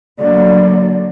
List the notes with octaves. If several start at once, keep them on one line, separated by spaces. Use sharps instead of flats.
D3 F#3 A#3 D5